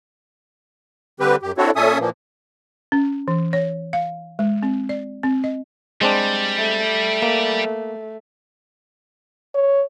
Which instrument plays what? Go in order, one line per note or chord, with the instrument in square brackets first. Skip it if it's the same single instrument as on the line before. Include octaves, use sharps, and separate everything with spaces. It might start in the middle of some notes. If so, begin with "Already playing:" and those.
[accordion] D3 G3 C4 G4 B4
F#2 G4
C4 D4 E4 F#4 A4 C#5
A#2 C#4 A4 E5 G#5 D#6
A#2 E3 F3 A#3
[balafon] C#4
E3
C#5
F5
G#3
C4
D5
C4
D#5
[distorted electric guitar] G3 [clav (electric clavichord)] G#3 C4 D4
[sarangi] A3
[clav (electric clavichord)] A#3
[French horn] C#5